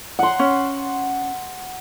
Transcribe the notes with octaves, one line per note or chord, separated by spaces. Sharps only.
F#5 C6
C#4